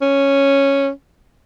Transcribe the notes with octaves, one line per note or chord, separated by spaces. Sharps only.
C#4